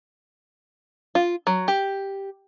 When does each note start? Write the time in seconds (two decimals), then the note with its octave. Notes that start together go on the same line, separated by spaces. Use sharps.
1.15 F4
1.47 F#3
1.68 G4